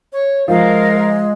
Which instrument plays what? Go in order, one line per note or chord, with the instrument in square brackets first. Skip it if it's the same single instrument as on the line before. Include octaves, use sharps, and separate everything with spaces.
[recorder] C#5
[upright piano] F3 [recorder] G#3 [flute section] A#4 F5